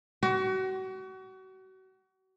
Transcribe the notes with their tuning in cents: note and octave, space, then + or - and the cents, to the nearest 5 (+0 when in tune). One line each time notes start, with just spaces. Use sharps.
F#4 +35